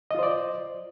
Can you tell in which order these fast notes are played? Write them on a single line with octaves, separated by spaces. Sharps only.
D#5 F4 C5 D5